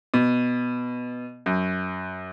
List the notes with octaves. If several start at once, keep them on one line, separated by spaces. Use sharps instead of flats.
B2
F#2